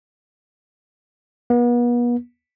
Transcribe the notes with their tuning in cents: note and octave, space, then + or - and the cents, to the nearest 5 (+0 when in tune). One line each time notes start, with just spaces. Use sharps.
B3 -40